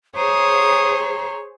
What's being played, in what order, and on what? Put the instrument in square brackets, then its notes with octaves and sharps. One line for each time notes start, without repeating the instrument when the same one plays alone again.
[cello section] G#4 C5 [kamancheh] C#5 [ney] A#5 [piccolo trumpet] D#6